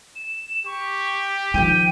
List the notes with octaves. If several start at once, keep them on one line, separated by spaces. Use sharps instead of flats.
E7
G4 C#6
D#3 F3 G5 D#7